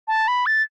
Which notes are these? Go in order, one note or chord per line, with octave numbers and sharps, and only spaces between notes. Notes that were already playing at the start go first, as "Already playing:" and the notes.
A5
B5
A6